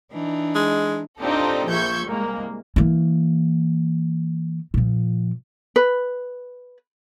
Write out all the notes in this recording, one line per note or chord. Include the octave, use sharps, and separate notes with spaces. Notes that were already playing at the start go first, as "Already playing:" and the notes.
E3 D4 D#4
G#3
C4 D4 D#4 F4 G4 A4
A#1 F3 E5 C#6 G6 G#6
C2 G#3 A#3
E3 A#3
A#2 F3
B4